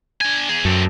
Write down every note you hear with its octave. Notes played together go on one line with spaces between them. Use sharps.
D4 G#5
E2 G#4
F#2 A3 C4